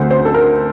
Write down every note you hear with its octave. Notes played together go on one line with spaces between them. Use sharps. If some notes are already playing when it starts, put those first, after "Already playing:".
Already playing: D2 D3 A3 C4 C5
C5
A4
A#4